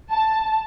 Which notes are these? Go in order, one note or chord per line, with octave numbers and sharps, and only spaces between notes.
A5